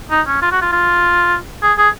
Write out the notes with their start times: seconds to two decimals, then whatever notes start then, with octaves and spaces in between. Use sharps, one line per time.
0.11 D#4
0.27 C#4
0.42 F4
0.52 F#4
0.62 F4
0.72 F4
1.63 G#4
1.78 G#4